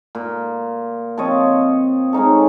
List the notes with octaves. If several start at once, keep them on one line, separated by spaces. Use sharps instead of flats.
A#2
F3 C4 C#5 D#5
G#3 C#4 D#4 A4